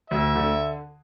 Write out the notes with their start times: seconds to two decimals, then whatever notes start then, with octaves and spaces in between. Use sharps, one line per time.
0.10 D2 E5
0.36 D3